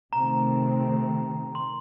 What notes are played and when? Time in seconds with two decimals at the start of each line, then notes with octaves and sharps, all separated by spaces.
0.13 C3 D#3 A3 C4 A#5
1.55 C6